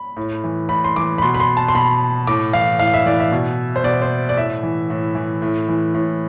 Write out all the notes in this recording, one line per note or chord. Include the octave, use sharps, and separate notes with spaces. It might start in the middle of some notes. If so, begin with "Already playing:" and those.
Already playing: B5
A2
E3
A2 B5
C6
E3 D6
B5
B2 C6
B5
C6
A5
C6
B2 B5
A2 D6
E3 F5
A2 F5
E5
E3 D5
E5
B2
C5
B2 D5
C5
D5
A2 E5
E3
A2
E3
A2
E3
A2